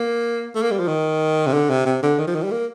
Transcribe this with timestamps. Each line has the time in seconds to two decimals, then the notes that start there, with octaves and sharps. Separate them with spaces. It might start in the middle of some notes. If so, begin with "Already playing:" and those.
Already playing: A#3
0.55 A3
0.62 A#3
0.71 G3
0.79 F3
0.88 D#3
1.46 C3
1.53 D3
1.70 C3
1.86 C3
2.03 D3
2.19 D#3
2.27 F3
2.35 D#3
2.43 G3
2.51 A#3